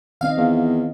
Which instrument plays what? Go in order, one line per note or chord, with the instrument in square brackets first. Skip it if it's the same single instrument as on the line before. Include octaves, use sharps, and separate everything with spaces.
[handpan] D#3 C4 D#5 [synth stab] F5
[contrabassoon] E2